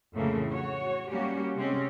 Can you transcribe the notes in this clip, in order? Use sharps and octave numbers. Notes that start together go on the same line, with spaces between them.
F2 A2 C#3 E3 A3 A#3
F#4 C#5
G3 A#3 C#4 F#4 G4
C3 G#3 C4 C#4